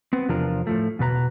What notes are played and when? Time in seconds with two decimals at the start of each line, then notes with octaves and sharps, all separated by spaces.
0.13 B3 C4
0.29 E2 C3 F3 D4 F4 A#4
0.67 A2 F3 A3
0.99 E2 B2 B4 A#5